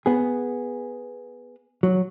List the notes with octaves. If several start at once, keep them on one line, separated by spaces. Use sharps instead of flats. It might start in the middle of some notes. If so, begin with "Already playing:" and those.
B3 G#4
F#3